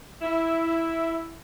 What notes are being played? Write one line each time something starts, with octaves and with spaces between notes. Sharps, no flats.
E4